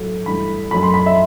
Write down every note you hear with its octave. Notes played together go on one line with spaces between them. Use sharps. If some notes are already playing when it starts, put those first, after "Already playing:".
Already playing: A2 F#3 A3
G2 E3 A3 B5
F#2 F#3 A3 B5
C6
B5
E5